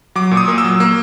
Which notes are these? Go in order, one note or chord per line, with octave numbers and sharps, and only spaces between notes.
F#3 D6
A#2
D#6
A#3
E6
F#3
A#3